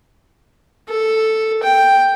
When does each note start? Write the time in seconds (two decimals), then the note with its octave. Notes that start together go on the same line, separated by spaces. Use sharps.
0.89 A4
1.63 G5